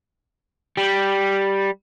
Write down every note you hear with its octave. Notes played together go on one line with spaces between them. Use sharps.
G3